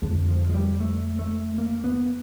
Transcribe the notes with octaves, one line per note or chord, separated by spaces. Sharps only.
F2 D3 G#3
F3
G#3
G3
A3
A3
A#3
B3